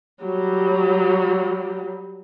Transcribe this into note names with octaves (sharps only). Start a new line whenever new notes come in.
F#3 G3